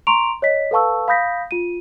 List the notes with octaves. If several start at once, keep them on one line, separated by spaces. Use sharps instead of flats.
A#5 C6 C#6 D7 F7
C#5 D#5 B6
A4 B4 F5 A5 C#6 E6
F5 B5 D#6 G6 A#6 B6
F4 D#7